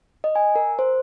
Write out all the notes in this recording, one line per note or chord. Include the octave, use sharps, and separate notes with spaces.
D#5
G#5
A#4
C5